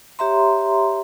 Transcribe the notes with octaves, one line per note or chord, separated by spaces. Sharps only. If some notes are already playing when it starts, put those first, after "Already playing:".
G4 C#5 E5 A#5 C6